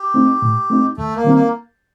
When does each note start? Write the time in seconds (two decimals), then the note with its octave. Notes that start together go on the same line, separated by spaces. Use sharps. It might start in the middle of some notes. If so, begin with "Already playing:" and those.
Already playing: G4
0.14 A3 C4 D#4
0.42 A2
0.70 A3 C4 D#4
0.97 D#2 A3
1.16 A#3
1.24 D#3 G3 C4 D#4
1.34 A#3